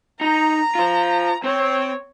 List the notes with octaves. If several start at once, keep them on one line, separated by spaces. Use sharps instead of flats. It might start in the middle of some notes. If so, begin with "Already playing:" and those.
D#4 A#5
F4 C5
C4 C5 C#5